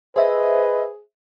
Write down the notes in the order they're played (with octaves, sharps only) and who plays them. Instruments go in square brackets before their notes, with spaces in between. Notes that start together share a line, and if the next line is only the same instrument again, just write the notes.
[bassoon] G#4 [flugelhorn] B4 [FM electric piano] C5 E5 [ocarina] D#5